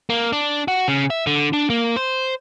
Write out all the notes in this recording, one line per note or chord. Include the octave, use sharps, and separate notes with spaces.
A#3
D4
F#4
C#3
E5
D3
D4
A#3
C5